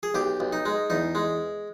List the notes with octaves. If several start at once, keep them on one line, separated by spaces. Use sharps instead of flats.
G#4
B1 G4
B1
D#4
G#3
E2 D#4
G#3